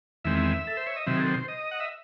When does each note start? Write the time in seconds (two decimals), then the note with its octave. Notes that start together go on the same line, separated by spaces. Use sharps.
0.24 E2 D#3 G#3 C4 E5
0.67 A4
0.77 C5
0.87 C#5
0.96 D#5
1.07 C3 D#3 F#3 C4 E5
1.16 G#4
1.20 A4
1.34 C5
1.48 D#5
1.71 F#5
1.80 E5